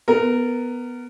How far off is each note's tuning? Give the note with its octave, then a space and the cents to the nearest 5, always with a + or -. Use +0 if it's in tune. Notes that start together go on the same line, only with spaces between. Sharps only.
B3 +0 A#4 -15